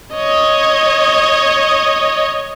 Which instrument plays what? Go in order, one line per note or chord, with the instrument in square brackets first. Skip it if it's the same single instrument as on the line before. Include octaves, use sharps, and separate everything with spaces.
[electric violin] C#5 D#5